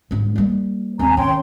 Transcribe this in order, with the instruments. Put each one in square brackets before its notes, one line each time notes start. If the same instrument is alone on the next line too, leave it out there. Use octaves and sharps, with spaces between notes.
[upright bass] G1 G#2
G3 A#3
[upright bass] D#2 C4 [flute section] G#5 A#5
[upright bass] D#3 C#4 [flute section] C#5 G5 C6